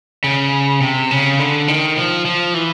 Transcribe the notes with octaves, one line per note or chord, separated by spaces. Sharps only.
C#3
C3
C#3
D3
D#3
F3
F3
E3